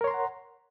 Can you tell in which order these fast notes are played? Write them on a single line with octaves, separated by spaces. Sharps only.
A#4 C#5 C6 A#5 F#5